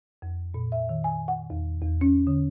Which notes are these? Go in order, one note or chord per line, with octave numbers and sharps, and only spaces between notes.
F2
A#2
E5
D#3
G#5
F#5
E2
E2
C#4
D3